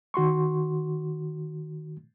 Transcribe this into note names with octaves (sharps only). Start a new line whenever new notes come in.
D#3 F#4 C6 C#6